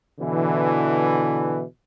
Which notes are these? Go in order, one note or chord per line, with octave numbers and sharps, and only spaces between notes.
B2 D3 E3